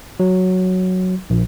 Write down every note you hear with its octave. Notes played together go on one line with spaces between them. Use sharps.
F#3
A#1